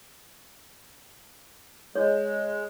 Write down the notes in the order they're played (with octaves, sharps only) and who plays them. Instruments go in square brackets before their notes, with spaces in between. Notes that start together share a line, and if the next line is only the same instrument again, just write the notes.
[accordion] G#3 [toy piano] C#5